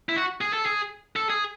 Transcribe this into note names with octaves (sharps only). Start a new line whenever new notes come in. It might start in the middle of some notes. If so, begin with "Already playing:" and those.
E4
F#4
G#4
A4
G#4
A4
G#4